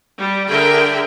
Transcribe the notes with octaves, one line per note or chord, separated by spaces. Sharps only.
G3
D3 G#4 A#4 E5 G5